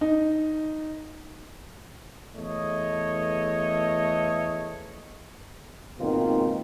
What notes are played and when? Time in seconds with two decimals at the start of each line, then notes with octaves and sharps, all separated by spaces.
0.01 D#4
2.36 E2 A3 C#5 D#5
5.99 G#2 B2 D#3 A#3 C4 F4